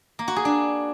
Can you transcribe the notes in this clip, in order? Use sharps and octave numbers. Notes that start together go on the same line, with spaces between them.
A#3
F#4
G#4
D4